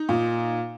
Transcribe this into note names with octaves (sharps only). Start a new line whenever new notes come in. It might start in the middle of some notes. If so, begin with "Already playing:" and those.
Already playing: D#4
A#2